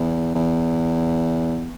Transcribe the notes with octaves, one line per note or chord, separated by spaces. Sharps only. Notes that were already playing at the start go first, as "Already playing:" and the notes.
Already playing: E2
E2